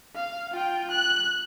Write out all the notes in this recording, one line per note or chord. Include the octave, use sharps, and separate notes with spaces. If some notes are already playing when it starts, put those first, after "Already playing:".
F5
F4 G5
F#6